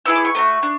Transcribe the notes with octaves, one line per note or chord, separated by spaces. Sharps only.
B3 E4 G#4 E6
D6
C#6
A3 D4 F#4
D4